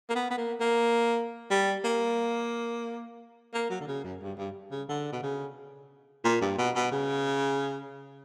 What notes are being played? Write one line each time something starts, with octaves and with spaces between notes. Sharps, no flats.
A#3
B3
B3
A#3
A#3
G3
A#3
A#3
F#3
D3
C#3
F#2
G2
G2
C#3
D3
B2
C#3
A#2
G2
B2
B2
C#3